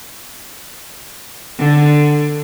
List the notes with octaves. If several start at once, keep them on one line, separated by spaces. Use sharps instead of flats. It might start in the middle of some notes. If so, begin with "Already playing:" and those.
D3